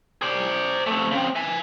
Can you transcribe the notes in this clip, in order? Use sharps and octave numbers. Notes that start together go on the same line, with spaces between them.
C5 D5
A3 C4
C#3 C4
E5 G#5